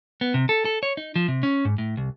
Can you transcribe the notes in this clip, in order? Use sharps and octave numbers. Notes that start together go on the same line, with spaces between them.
B3
C3
A4
A4
C#5
D#4
F3
C3
C#4
G#2
A2
C2